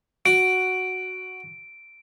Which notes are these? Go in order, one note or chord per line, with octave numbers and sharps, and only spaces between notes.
F#4 D7